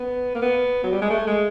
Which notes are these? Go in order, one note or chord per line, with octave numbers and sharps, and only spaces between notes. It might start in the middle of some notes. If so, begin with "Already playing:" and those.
Already playing: B3
A#3
B3
F#3
G3
G#3
A3
G#3